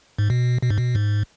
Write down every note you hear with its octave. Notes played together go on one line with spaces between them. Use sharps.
G#2
B2
B2
G#2
B2
G#2